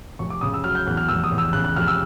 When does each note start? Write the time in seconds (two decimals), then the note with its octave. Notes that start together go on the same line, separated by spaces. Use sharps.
0.19 F1 C#6
0.30 D6
0.41 C#3 D#6
0.54 E6
0.64 F#3 F6
0.75 G6
0.87 E2 F#6
0.97 F6
1.09 F1 E6
1.24 D#6
1.32 E2
1.38 E6
1.53 C#3 F#6
1.64 F#6
1.76 F1 F6
1.87 E6